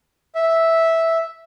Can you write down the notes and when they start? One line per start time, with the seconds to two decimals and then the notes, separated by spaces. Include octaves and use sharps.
0.35 E5